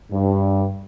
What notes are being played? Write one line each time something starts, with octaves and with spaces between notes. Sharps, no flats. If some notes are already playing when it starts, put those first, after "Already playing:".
G2